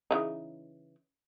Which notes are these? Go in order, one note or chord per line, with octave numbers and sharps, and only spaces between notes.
C#3 E3 D#4